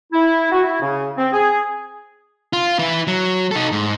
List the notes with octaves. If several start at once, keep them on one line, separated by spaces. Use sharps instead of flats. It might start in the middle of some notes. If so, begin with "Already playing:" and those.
E4
F#4
E4
C#3
C4
G#4
F4
E4 B4
F#3
D#4 A4
G#2